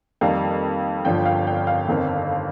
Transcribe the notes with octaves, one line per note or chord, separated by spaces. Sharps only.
F2 D#3 G3 A#3 F5
G1 G2 F3 G5
F5
G5
F5
G1 F2 D#3 C4